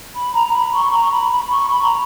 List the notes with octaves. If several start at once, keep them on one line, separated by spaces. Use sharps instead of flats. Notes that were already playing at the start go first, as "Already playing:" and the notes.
B5
A#5
B5
C#6
A#5
B5
B5
C#6
B5
A#5